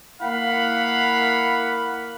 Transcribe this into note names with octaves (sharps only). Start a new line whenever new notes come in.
A#3 E4 F5 F#5 B5